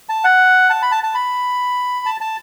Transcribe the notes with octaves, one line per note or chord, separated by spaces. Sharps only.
A5
F#5
A5
B5
A5
A5
B5
A5
A5